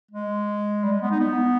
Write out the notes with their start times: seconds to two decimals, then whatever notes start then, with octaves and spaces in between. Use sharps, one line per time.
0.11 G#3
0.84 G3
0.93 G#3
1.02 B3
1.11 D#4
1.20 B3